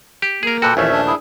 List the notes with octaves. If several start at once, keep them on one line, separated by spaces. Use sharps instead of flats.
G4
A#3 G#4 A#4
A#2 F#4 A4 B4 G5
A#1 D#2 E3 A3 C#4 E5 G#5
D4
E4 G#4